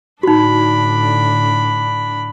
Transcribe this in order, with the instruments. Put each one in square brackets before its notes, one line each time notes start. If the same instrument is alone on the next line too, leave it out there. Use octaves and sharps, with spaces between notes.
[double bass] A2 D3 [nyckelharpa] D4 B5 [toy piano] D#4 F#4